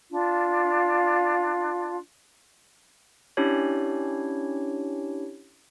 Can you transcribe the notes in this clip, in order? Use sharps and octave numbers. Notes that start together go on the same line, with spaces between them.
D4 F4
C#4 D4 E4 G4 C#5